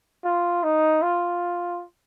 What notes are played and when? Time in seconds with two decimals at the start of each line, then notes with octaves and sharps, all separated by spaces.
0.24 F4
0.63 D#4
1.02 F4